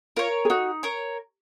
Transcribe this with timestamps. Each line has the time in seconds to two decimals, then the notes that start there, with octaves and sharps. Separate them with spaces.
0.16 F4 A#4 C#5
0.45 G#4
0.50 D#4 F#4
0.83 A#4 C#5